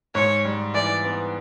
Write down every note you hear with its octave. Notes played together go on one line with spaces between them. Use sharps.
G#2 C#5
G3
E3 D5
B3